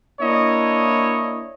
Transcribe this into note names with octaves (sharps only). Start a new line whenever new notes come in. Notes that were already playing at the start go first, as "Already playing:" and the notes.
A#3 D4 E4 C#5 D#5